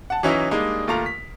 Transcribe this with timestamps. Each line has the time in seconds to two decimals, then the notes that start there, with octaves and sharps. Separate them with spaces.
0.10 F#5 A5
0.23 E3 F#3 C#4 D#4 E4
0.51 G3 G#3 A#3 D4 D#4
0.87 D#2 A3 F4 A#5 F7
1.06 B6